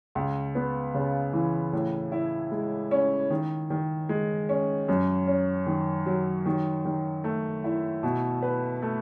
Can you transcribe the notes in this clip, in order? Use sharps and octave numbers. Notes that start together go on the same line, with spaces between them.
C#2
B3
C#3
E3
A2
E4
G#3
C#4
D#3
D#3
G#3
C#4
F#2
C#4
D#3
F#3
D#3
D#3
A3
E4
B2
B4
A3